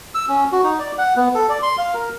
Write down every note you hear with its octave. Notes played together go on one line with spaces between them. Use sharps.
E6
C#4
F#4
D#4
D5
F#5
B3
A4
D5
C6
F5
A#4